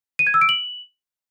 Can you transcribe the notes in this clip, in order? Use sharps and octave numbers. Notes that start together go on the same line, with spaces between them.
D#7
G#6
E6
D7
F#7